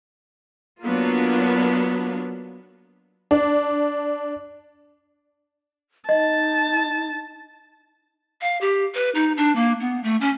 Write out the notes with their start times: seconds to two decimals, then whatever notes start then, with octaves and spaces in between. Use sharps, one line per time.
0.83 F#3 A#3 B3 D4 F4
3.31 D4
6.09 D#4 D#5 A5
8.41 F5
8.61 G4
8.95 B4
9.15 D#4
9.37 D4
9.56 A#3
9.80 B3
10.04 A3
10.21 C#4